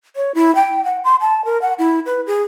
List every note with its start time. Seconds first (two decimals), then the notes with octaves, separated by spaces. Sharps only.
0.16 C#5
0.35 E4
0.55 G5
0.85 F#5
1.04 C6
1.21 A5
1.45 A#4
1.62 F#5
1.79 E4
2.06 B4
2.27 G#4